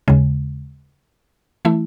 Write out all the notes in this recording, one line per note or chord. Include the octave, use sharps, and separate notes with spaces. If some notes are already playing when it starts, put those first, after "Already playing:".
D#2 C#3 G#3
E3 A3 E4